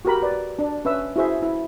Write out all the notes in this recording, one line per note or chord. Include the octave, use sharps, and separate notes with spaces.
F#4 G4 A#4 B5
B4 D5
D4
C#4 B4 E5 E6
E4 F#4 G#4 C5 E5
E4